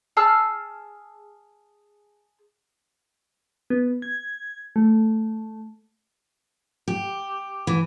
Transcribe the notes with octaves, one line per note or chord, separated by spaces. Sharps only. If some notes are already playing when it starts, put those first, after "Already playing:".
G#4 A5 E6 F6
B3
G#6
A3
G4
E3